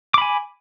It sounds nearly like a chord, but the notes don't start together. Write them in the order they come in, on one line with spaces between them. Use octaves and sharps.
D6 B5 G#5